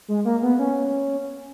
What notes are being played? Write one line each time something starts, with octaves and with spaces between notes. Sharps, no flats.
G#3
A#3
B3
C#4